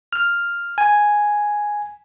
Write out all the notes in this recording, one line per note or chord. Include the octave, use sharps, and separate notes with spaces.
F6
G#5